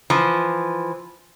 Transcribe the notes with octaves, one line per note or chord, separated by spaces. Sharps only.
E3 F3